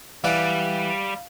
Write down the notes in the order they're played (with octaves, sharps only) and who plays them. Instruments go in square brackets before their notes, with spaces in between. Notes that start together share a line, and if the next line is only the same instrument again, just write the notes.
[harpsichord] E3 D5 F#5 [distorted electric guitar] G3 [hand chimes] F5